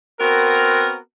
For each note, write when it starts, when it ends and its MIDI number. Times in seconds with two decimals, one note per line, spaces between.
0.19 0.96 59
0.19 0.96 60
0.19 0.96 66
0.19 0.96 70